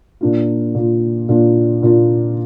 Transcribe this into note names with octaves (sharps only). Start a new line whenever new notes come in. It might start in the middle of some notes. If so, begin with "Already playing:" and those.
A#2 A#3 D4 F4
A#2 A#3 D4 F4
A#2 A#3 D4 F4
A#2 A#3 D4 F4